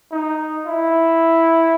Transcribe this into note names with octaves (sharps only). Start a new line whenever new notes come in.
D#4
E4